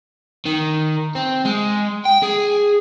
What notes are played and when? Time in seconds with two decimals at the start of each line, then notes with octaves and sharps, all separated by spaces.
0.46 D#3
1.15 C4
1.45 G#3
2.06 G5
2.23 G#4